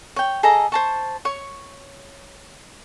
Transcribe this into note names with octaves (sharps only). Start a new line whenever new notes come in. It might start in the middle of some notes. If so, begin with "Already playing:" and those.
C#5 G5
G#4 A4 D#5 A#5
C5 A5 C#6
C#5 C#6